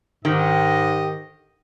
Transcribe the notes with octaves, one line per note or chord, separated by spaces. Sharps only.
G#2 D#3 G4 D#5